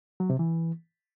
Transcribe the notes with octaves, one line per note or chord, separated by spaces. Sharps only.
F#3
C3
E3